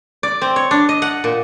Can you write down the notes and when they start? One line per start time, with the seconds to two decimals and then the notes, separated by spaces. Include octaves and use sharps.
0.23 D5
0.41 C4
0.56 C#5
0.71 D4
0.89 D#5
1.02 F#5
1.24 A#2